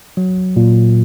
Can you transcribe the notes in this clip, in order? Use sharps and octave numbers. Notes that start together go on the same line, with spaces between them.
F#3
A#2